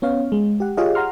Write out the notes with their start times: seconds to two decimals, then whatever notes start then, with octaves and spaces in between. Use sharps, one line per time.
0.02 B3 C#4 C#5 F5
0.32 G#3
0.60 G4 F#5
0.77 F4 G4 G#4 C#5 D#5 F5
0.95 F#5 A#5 C6 F6